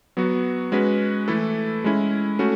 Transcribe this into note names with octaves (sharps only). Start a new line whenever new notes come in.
F#3 B3 F#4
G#3 C#4 F#4 B4
E3 A3 E4 A4
G#3 C#4 E4
A3 C#4 F#4